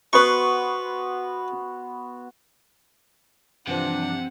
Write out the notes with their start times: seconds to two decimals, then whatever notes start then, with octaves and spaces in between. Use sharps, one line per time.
0.13 B3 F#4 B4 C6 C#6
3.67 G2 C3 E3 F3 D4 F#5